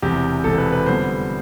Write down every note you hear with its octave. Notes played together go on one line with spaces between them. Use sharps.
E1 E2 C3 G4
E1 E2 C3 A4
B4
B4
F2 D3 G3 B3 C5